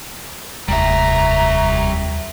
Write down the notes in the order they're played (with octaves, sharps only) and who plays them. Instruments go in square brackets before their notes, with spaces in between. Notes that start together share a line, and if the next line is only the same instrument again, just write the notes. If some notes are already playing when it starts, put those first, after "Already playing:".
[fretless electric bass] F1 [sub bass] D#2 [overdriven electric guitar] G3 E5 [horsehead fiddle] A#5